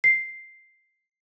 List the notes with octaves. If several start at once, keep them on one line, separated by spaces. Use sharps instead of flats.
C7